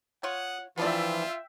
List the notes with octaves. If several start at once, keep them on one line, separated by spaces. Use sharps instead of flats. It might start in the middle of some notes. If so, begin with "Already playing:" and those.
F4 C#5 F#5 D#6
E3 F3 B3 D4 F4 D5 E5 G5